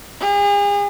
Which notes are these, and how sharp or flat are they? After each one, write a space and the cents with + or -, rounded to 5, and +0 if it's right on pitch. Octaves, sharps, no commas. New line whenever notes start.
G#4 -40